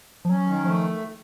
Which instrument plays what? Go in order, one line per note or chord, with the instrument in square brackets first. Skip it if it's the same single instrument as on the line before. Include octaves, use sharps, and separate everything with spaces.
[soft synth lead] F3
[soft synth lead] F#3 [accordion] C#4
[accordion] D#3
[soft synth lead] F3 [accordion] A3